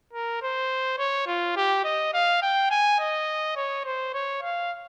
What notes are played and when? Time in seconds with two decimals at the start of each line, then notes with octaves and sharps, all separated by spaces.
0.13 A#4
0.42 C5
0.99 C#5
1.27 F4
1.56 G4
1.85 D#5
2.14 F5
2.43 G5
2.71 G#5
3.00 D#5
3.56 C#5
3.85 C5
4.14 C#5
4.43 F5